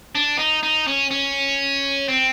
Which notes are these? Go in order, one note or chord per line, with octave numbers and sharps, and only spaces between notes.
D4
D#4
D#4
C#4
C#4
C4